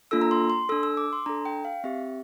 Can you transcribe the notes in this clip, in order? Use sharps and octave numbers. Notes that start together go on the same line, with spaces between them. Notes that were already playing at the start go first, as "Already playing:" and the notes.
A#3 D4 F4 A4 E6
A#5
C6
C6
D4 A4 E6
E6
D6
C6
D4 A4 A#5
G5
F5
C4 G4 E5